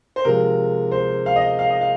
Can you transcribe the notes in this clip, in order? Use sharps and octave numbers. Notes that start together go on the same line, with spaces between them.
C5
C3 F3 G#3 A#4
C5
F5
D#5
F5
D#5
F5